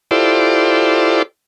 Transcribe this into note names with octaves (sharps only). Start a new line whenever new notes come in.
E4 F4 G4 A4 C5 D5